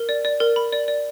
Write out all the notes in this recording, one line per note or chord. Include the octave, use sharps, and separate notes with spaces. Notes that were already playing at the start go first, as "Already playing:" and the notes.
Already playing: A#4
D5
D5
A#4
B5
D5
D5